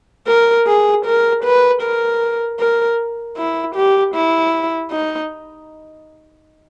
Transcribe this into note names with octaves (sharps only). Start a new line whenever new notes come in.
A#4
G#4
A#4
B4
A#4
A#4
E4
G4
E4
D#4